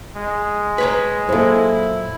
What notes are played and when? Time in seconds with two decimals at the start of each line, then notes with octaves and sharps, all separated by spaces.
0.16 G#3
0.78 B4 C#5 A#5
1.29 F#2 A#2 E4 A4 C5